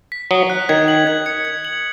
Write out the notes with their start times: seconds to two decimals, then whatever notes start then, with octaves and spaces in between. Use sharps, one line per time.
0.12 B6
0.31 F#3 D#6
0.50 F#6
0.69 D#3 G#6
0.88 F#7
1.07 G#6
1.26 C#7
1.45 G#6
1.65 F#7